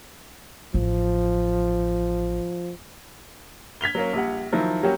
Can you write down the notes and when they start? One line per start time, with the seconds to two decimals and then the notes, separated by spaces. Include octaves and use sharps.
0.74 A1 F3
3.81 G#6 B6 F7 G7
3.95 F#3 A#3 C#4
4.13 A#1 G3 F#5
4.52 D#3 F3 F#3 E4
4.83 F#3 G3 A#3 C#4 F#4 G4